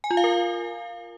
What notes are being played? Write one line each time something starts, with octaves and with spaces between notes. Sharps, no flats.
G#5
F4
F5
A#4